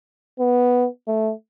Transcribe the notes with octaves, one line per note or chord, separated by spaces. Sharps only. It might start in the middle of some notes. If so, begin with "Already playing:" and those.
B3
A3